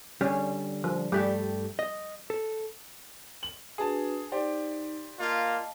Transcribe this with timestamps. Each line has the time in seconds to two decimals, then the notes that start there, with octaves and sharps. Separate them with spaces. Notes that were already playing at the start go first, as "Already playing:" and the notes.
0.21 D3 G3 C#4
0.84 F3
1.12 G2 G3 A3 G4
1.79 D#5
2.30 A4
3.43 F#7
3.78 D4 F#4 G#4 B4 A5
4.32 D#4 G4 C5 D5
5.18 A#3 F4 D#5 F5 A5